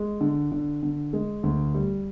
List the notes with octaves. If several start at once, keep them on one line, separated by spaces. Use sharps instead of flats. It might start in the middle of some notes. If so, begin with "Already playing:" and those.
Already playing: G#3
D3
D3
D3
G#3
D2
G3